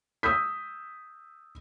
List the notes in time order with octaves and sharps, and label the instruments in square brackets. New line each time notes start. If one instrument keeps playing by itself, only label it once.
[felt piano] D#6 E6 G6 B6